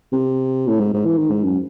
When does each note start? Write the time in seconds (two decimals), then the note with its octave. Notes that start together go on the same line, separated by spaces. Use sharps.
0.12 C3
0.68 A2
0.80 G#2
0.93 G#2
1.05 E3
1.18 D#3
1.31 G#2
1.43 F#2